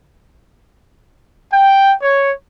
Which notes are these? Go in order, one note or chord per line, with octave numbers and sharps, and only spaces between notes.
G5
C#5